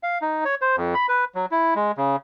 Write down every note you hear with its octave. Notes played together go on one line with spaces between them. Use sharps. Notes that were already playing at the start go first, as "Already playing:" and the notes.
F5
D#4
C#5
C5
F2
B5
B4
F#3
E4
G#3
C#3